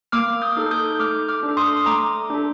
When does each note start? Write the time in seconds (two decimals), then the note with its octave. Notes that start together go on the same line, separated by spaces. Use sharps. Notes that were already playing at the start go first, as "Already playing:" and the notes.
0.12 A#3 D6 F6
0.42 D#6 G6
0.57 D#4 A4
0.71 D#6 G6
0.99 A3 D6 F6
1.28 D6 F6
1.43 D4 A4
1.57 C6 D#6
1.77 D#6
1.86 A3 A#5 D6
2.30 D4 A4